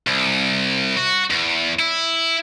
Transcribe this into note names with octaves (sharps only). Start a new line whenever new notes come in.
C2
F#4
E2
E4